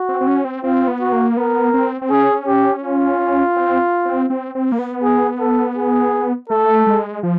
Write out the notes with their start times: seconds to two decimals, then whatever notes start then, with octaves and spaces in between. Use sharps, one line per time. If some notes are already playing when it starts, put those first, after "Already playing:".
Already playing: F#4
0.09 C4
0.21 C4
0.27 C#4
0.45 C4
0.64 C4 F4
0.88 B3
1.01 F#4
1.12 A#3
1.37 B3 A#4
1.74 C4
2.02 C4
2.10 C#4 G#4
2.47 G4
2.83 F4
3.56 C4
4.05 C4
4.30 C4
4.55 C4
4.72 A#3
4.79 B3
5.03 G#4
5.40 A4
5.76 G#4
6.49 A3 A4
6.87 G#3
7.23 F3